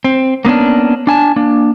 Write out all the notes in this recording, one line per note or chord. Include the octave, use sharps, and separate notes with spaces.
C4
A#3 B3 C#4 D4
D4 G#5 A5
A#3 D4